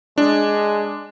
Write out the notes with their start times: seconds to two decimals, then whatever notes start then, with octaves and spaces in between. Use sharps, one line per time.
0.18 G#3 D4